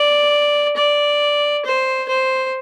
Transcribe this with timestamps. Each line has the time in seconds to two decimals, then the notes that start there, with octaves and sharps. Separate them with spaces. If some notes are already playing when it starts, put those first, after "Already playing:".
Already playing: D5
0.77 D5
1.65 C5
2.09 C5